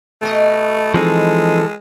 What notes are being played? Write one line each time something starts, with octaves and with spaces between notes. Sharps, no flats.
B2 A3 D#5
E3 F3 G#3 C4 D#4 A4